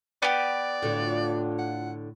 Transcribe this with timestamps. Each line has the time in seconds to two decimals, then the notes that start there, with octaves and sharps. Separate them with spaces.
0.22 B3 G4 D5
0.82 A2 D3 D4 F4 F#4
1.58 F#5